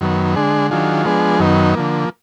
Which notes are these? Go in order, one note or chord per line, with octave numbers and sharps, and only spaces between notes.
F#2 D#3 F#3 B3
D3 G#3 D4 G#4
D#3 F#3 D4 F4 G#4
F3 G#3 B3 D4 G#4
F#2 D#3 F#3 B3 D#4
D3 F3 A#3